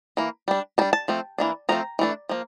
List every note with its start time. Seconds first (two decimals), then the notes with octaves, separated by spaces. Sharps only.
0.17 E3 A#3
0.48 G3 D4
0.78 G3 A5
0.81 D4
0.93 A5
1.08 F3 A3 C4
1.38 E3 A#3 D4
1.69 F3 A3 C4 A#5
1.99 E3 A3 D4
2.29 F3 A#3